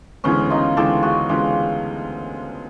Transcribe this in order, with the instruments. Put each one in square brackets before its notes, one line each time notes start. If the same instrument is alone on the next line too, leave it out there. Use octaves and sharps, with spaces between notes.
[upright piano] D2 C#3 E3 G#3 [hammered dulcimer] B3 C#4
[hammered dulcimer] D#4 F4
[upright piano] D2 C#3 E3 G#3 [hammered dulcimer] G4 A4
[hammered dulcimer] F#4 G#4
[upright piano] D2 C#3 E3 G#3 [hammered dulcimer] F4 G4